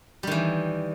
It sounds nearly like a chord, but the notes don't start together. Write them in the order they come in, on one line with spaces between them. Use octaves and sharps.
G3 D#3 E3